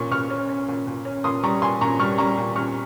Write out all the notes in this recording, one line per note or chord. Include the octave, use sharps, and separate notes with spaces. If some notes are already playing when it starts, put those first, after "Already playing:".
Already playing: A#2 C#4 C#6
A#2 C#6 F6
C#4
C#4
A#2
A#2
C#4
A#2 C6 D#6
G3 A#5 C#6
A#2 G#5 C6
A#2 A#5 C#6
G3 C#6 F6
G3 A#5 C#6
A#2
A#2 C#6 F6